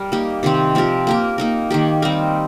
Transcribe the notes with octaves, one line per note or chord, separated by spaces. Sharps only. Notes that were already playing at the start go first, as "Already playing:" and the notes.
Already playing: G3 A#4
A#3 D#4 G4
C3 D#3 C4 G4
F3 C4 G4 A#4
A#3 G4 A#4
A#3 D#4 A#4
D#3 A#3 G4
G3 C4 D#4 A#4